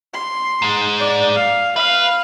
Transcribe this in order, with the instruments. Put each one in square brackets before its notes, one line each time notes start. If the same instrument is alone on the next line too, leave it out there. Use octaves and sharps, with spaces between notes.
[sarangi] C6
[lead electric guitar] G#2 G#3
[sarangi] D5
F5
[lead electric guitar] B4 [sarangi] F5